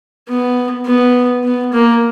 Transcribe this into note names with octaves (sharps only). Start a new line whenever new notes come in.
B3
B3
B3
A#3